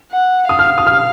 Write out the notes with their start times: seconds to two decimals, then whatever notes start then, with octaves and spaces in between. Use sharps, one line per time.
0.12 F#5
0.49 F5 D#6
0.59 F6
0.78 D#6
0.87 F6